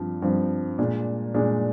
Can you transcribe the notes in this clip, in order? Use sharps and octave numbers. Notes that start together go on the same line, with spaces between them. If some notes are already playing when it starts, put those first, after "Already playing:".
Already playing: G2 F3 C4
G2 F3 C4
A#2 G#3 D4
A#2 G#3 D4